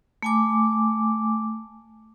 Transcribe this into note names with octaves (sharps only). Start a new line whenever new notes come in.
A3 G#5 D6